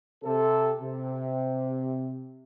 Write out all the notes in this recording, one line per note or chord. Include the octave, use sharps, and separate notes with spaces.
C3 A4
C3